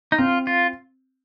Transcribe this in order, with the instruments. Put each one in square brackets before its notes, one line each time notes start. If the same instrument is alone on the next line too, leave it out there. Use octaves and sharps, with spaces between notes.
[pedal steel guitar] D#4
[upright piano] C4 [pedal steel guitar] F4
[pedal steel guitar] F4